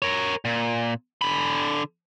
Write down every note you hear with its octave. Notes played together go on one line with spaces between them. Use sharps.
A#4 C#5
A#2
D3 B5